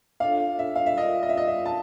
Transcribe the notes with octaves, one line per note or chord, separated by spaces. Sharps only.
D4 F4 A4 C#5 F5
E5
F5
E5
F4 A#4 D5 D#5 F5
D#5
E5
D#5
E5
A5